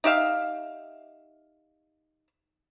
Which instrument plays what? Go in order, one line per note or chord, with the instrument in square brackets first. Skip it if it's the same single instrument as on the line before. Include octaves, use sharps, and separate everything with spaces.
[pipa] D#4 G4 E5 F5